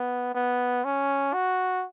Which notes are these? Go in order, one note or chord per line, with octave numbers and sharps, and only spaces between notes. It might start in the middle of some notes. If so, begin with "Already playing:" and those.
Already playing: B3
B3
C#4
F#4